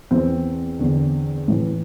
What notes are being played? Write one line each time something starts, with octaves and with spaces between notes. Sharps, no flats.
E2 E3 C4
E2 D3
A2 E3